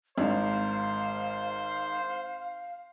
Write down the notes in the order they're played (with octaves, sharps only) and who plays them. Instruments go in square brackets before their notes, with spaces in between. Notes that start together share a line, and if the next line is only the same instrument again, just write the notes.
[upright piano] G#1 G#2 [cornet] C5 [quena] F5